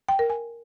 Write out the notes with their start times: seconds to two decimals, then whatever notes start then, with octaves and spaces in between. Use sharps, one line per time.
0.09 G5
0.19 A#4
0.30 G#5